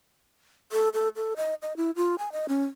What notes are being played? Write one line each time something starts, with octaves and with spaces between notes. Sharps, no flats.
A4
A4
A4
D#5
D#5
E4
F4
G#5
D#5
C#4